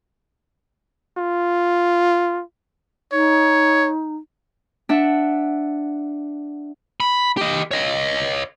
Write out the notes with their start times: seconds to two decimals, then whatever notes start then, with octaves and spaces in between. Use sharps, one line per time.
1.18 F4
3.12 D#4 C#5
4.89 D4 E5 F#5
7.00 B5
7.37 G4 D#5
7.71 C#5 D#5